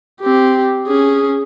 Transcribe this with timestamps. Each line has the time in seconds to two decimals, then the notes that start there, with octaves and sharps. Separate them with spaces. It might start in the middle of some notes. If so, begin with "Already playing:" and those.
0.22 C4 G4
0.87 C#4 G#4